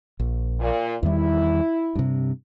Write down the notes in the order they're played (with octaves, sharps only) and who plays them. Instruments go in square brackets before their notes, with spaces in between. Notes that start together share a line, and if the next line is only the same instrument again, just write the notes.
[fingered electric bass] A#1
[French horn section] A#2
[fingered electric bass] E2 D#3 G3 [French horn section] E4
[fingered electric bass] G2 C3